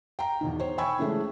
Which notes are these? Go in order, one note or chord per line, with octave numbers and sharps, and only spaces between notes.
G5 A#5
E2 B2 D#3
C5 C#5
G5 G#5 B5 C#6 E6 G#6
C#3 E3 G#3 A3 D4